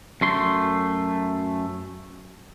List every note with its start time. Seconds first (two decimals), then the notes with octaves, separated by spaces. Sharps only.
0.21 F#2 A3 C6